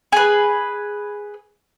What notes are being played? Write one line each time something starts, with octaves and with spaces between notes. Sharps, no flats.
G#4 B4